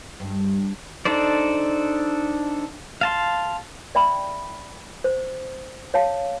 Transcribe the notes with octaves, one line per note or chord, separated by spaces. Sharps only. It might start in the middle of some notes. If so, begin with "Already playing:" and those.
G2
D4 D#4 A4 C5 D5
F5 A5 C6
D5 E5 G5 B5
C5
C#5 F5 A5